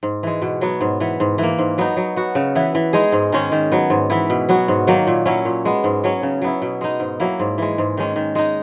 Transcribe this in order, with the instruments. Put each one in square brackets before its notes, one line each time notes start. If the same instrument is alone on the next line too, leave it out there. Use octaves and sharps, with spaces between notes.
[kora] G#2
E3 G#3
B2
F#3 B3
G#2
E3 B3
G#2
E3 A#3
G#2
F#3 B3 D#4
F#3
B3 F#4
C#3
E3 B3 E4
E3
G#3 D#4 G#4
G#2
D#3 G#3 C#4
D#3
F#3 B3
G#2
E3 B3 E4
B2
F#3 B3 F#4
G#2
D#3 F#3 A#3
A#2
F#3 C#4 E4
A#2
G#3 B3
G#2
F#3 C#4
C#3
F#3 B3 E4
B2
G#3 D#4
G#2
F#3 A#3 E4
G#2
E3 G#3
G#2
D#3 G#3 C#4
D#3
G#3 D#4